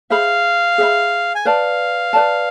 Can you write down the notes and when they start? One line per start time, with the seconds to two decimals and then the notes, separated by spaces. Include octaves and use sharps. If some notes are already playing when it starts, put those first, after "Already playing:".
0.10 G#4 C5 E5 F5 B5
0.78 G#4 C5 E5 B5
1.35 G#5
1.45 B4 D5 F5 A5
2.13 B4 D5 A5